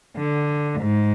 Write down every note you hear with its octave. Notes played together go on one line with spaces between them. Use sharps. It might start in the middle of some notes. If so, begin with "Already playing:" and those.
D3
G#2